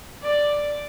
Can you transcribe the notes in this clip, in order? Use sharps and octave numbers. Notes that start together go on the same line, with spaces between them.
D5